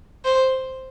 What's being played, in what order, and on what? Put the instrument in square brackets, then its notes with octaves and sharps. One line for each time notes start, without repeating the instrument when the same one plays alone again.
[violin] C5